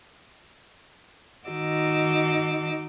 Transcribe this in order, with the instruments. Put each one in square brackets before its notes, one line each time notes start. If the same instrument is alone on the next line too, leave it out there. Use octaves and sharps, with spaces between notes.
[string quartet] D#3 D#4 F#4 D6 E6